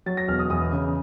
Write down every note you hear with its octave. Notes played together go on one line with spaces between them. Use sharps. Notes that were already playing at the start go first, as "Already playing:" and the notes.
F#3 A6
A#6
E1 F6
D#6
E2 D#6
C#3